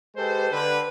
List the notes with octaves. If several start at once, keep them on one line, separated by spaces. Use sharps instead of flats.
G#3 G4 A4 B4 C5
D3 B4